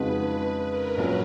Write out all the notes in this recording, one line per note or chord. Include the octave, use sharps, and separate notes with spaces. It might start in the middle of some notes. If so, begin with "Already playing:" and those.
Already playing: F2 C#3 G#3 D#4 F#4 B4
B4
A#4
A#1 A#2 F#3 C#4